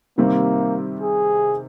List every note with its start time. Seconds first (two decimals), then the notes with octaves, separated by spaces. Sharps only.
0.18 C3 D#3 G3 A#3 C4
1.01 G#4